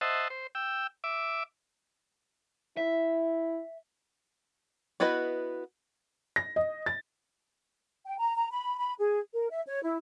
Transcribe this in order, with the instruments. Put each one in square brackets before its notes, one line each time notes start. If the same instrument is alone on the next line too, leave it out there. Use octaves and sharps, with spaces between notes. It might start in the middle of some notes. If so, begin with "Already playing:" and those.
[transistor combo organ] C5 D#5 E5 F#5 A5
C5
G5 E6
E5 D6
[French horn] E4 [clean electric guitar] E5
[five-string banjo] B3 E4 F#4 B4 D#5
[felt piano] A#6
D#5
A6
[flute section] G5
A#5
A#5
B5
B5
G#4
A#4
E5
C#5
E4